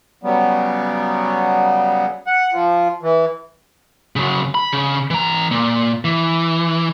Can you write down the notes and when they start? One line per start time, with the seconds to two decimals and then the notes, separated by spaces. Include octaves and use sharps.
0.23 C#3 F#3 G3 B3
2.27 F#5
2.52 F3
3.03 E3
4.16 C#3 F#3
4.55 B5
4.73 C#3
5.10 E3 A#5
5.51 A#2
6.05 E3